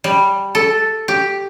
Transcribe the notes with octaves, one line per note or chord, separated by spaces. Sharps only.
G3
A4
G4